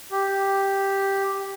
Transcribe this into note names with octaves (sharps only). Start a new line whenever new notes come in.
G4